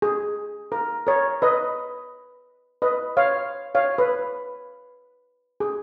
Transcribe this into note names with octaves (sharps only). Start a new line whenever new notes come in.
G#4
A#4
A#4 C#5
B4 D#5
B4 D#5
C#5 F5
C#5 F5
B4
G#4